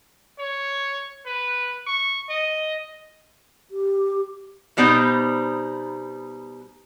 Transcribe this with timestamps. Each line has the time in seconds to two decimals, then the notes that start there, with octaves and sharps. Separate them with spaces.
0.39 C#5
1.26 B4
1.87 C#6
2.29 D#5
3.71 G4
4.77 B2 G3 B3 D#4 C5